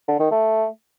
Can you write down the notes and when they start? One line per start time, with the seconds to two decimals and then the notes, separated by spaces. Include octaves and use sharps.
0.08 D3
0.20 D#3
0.31 A3